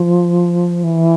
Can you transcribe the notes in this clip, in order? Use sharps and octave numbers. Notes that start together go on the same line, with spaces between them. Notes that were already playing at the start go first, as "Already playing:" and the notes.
Already playing: F3
E3